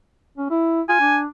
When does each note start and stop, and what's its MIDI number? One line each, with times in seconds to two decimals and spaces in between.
0.38 0.49 61
0.51 0.81 64
0.89 0.96 65
0.89 1.18 80
1.00 1.26 62